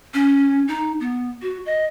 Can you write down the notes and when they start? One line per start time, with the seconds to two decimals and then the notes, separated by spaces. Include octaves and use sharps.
0.14 C#4
0.68 D#4
1.00 B3
1.42 F#4
1.66 D#5